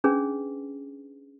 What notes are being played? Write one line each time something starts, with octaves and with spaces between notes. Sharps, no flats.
C#4 D4 G#4 B4